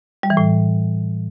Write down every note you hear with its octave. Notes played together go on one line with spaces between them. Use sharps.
G3
E3
A2